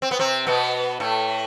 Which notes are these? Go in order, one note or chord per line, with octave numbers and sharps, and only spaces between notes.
C4
B3
C3 C4
B2 B3
A2 A3